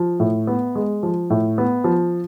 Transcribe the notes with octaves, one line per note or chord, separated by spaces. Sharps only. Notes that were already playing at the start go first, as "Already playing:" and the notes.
Already playing: F3
A2
B3
G#3
F3
A2
B3
F3